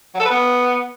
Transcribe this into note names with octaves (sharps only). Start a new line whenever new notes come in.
F#3
A4
B4
B3